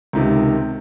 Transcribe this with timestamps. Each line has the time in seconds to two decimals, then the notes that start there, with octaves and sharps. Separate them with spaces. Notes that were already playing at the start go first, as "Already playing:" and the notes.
0.13 C#2 C3 D#3